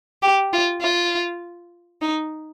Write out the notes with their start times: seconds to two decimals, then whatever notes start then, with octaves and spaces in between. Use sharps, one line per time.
0.22 G4
0.52 F4
0.82 F4
2.02 D#4